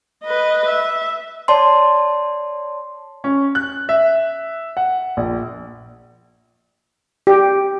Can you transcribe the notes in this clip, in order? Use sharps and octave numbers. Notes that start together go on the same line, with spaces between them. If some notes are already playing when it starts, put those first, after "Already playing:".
B4 D#5
E5
C#5 D5 A5 C6
C#4
F#6
E5
F#5
A#1
G4